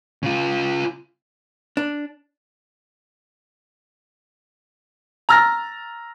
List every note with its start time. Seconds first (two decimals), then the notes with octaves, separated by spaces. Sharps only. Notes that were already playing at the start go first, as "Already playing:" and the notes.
0.23 C#3 F4
1.77 D4
5.29 A#5 E6 F6 A6 A#6